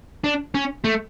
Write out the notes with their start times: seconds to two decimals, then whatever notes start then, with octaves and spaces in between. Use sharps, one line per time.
0.24 D4
0.55 C#4
0.84 A3